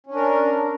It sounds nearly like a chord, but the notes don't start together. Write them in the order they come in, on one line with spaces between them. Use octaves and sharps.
C#4 D4 A#4